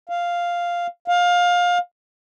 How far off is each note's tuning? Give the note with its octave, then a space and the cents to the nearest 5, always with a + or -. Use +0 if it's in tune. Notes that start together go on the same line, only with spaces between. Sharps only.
F5 -5
F5 +20